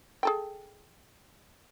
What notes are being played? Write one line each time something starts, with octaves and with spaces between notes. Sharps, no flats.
G#4 A4 G5